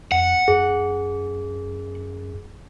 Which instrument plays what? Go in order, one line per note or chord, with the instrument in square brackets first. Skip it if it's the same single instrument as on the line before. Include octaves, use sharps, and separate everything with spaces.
[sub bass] F2 [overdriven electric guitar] F#5
[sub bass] F#2 [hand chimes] G#4